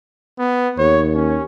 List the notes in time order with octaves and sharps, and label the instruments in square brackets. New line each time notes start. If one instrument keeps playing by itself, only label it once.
[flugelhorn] B3
[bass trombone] D#2 [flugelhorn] C#5
[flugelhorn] C#4